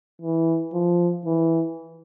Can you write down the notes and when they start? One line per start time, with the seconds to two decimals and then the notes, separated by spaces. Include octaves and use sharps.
0.22 E3
0.74 F3
1.25 E3